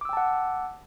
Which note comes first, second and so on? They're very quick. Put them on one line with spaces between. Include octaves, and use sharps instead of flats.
D6 E6 G5 A5 F#5